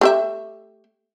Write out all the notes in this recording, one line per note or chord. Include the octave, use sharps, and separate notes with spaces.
A3 G4 E5